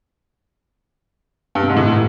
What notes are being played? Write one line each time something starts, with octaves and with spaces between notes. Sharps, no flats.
G2
C3
G#2
A2